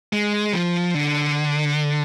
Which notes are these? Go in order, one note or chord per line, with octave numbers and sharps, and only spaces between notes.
G#3
F3
D3